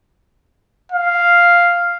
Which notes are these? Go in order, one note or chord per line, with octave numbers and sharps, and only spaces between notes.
F5